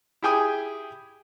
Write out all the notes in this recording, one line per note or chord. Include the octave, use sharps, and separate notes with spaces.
E4 G4 G#4 G5 G#5 D#6